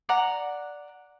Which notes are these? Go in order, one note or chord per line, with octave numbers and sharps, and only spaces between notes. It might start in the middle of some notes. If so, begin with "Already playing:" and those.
D5 F#5 A#5